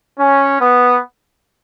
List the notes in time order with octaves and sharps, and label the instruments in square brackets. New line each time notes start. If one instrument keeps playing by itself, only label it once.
[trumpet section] C#4
B3